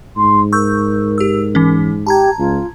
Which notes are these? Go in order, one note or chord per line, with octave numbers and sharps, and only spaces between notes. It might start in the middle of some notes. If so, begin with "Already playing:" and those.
G#2 C6
A#4 C#6 E6 G6
G4 E6
E3 C#4
G4 A5 A#5 G#6
C#2 F4